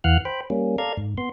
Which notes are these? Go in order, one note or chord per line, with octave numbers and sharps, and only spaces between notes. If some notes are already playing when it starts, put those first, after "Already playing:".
E2 E3 F5 F#5 F6 F#6
C5 G5 B5
G3 A#3 C#4
A4 D5 F5 A#5 G#6
G#2
B3 C6